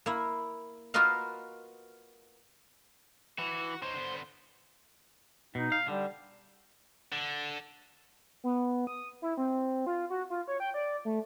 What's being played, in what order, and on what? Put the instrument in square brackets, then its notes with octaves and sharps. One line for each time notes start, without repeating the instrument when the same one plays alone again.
[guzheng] A#3 E4
F4 F#4 A#4 B4 D#5 F5
[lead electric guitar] E3 [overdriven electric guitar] F#4
[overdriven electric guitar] D#4 C#5 [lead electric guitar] C5
[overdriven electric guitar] D3 B3
[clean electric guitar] B2 [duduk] D#4
[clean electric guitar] F5
[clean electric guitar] D3 [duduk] G3
[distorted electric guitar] D3
[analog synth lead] B3
D#6
E4
C4
F4
F#4
F4
C#5
G5
D5
A3